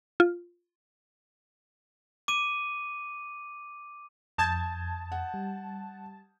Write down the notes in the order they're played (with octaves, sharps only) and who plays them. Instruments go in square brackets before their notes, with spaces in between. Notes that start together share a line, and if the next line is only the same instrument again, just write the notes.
[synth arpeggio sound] F4
[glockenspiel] D6 D#7
[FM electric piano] F2 [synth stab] A5 [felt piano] D#6 G6 G#6
[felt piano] F#5
[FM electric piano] G3